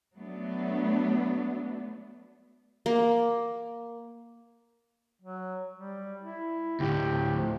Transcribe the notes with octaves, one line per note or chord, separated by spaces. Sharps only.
F#3 A3 B3 D4
A#3
F#3
G3
E4
D2 A2 G4
F3